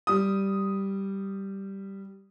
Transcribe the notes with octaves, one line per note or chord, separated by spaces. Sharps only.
G3 D#6